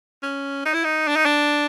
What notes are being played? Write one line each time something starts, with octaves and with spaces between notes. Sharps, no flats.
C#4
D#4
E4
D#4
D4
D#4
D4